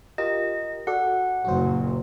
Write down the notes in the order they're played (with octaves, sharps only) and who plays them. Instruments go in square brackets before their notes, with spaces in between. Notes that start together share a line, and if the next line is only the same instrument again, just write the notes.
[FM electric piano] F4 G4 A#4 [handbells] D#5
[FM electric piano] F#4 A4 D5 [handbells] F#5
[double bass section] F#1 A#2 F#3 [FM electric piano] F#4 C5